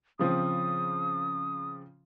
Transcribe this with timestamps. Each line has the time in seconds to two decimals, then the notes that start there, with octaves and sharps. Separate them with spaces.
0.19 C#3 F3 C4 D#6